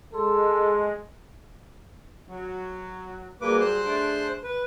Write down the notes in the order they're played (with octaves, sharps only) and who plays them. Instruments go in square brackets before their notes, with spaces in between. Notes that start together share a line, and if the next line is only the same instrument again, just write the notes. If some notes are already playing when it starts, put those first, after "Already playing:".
[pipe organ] G#3 [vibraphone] G#4 C6 [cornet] A4
[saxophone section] F#3
[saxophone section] F#3 G3 G#4 [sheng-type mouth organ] A#3 B4 D6
[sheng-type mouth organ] C5 C6 F#6
[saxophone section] A3 D4 G#4
[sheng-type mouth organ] B4